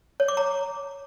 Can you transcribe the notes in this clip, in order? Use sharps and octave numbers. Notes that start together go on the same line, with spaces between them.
C#5
D6
A#5